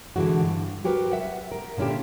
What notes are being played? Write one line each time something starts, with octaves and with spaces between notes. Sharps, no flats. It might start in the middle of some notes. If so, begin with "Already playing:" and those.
B2 D3 E3 G#3 F#4
G2
F#3 F#4 G4 A#4 B4
E5 F#5
A#4
A#2 D3 C#4 E4 G4